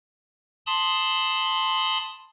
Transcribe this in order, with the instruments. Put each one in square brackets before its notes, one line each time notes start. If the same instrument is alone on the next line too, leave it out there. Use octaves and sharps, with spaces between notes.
[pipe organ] A5 B5 C6 D#6